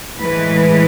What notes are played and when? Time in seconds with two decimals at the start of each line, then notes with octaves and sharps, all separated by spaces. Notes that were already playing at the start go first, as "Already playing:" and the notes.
0.19 A2 E3 G#3 B4